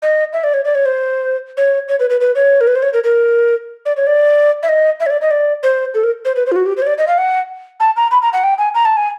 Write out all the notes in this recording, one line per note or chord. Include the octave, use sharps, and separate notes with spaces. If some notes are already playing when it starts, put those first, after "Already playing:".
D#5
E5
D5
C#5
D5
C#5
C5
C#5
C#5
B4
B4
B4
C#5
A#4
B4
C5
C#5
A#4
A#4
D5
C#5
D5
E5
D#5
E5
C#5
D5
D#5
D5
C5
A4
A#4
C5
B4
C5
F4
F#4
G4
C5
C#5
D5
D#5
F5
F#5
A5
A#5
B5
A#5
F#5
G5
G#5
A#5
A5
G#5